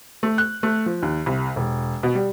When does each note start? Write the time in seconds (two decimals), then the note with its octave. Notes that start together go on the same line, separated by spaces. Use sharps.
0.23 A3
0.38 F#6
0.63 A3
0.86 F3
1.03 D#2
1.26 C2
1.56 E1
2.03 B2
2.15 G3